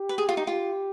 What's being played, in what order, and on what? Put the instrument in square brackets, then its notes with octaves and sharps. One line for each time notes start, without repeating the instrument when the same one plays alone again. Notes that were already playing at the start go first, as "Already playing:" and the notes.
Already playing: [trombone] G4
[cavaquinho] B4
G#4
F4
D#4
[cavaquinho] F4 [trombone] G4